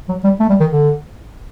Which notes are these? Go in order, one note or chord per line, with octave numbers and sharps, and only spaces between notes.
F#3
G3
A3
G3
D#3
D3